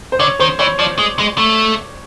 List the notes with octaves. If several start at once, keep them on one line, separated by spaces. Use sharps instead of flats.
C5
D3 C#5
D#3 C5
E3 C#5
F3 D5
G#3
G#3
A3